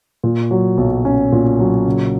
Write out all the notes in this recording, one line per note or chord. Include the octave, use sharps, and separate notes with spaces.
A#2
F#3
B1
C#4
A#2
F#3
C#3